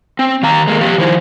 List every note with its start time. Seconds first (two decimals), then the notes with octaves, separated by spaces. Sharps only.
0.19 C4
0.43 D#3 F5 A#5
0.68 G#3 A#3
0.81 F3 G4 F5
0.98 D#3 F3 E4 C5